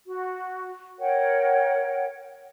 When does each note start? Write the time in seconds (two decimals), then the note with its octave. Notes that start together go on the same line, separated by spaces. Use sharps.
0.07 F#4
0.99 A#4 C#5 F#5 G5